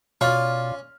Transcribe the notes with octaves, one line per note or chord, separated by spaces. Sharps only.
B2 C#4 F4 D5 F6